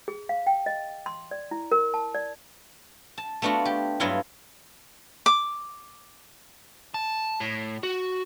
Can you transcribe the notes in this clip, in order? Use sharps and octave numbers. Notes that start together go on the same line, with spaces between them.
G#4
F5
G5
D#5
C6
D5
E4
A#4
A5
D5
A5
A3 B3 D4 F4 F#4
G4
G2 F#3 B3 E4 F4
D6
A5
A2
F#4